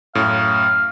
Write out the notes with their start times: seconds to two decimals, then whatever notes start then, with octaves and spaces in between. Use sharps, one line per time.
0.15 F#2 A2 F5